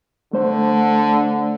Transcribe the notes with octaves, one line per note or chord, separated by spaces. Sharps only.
D3 A3 C5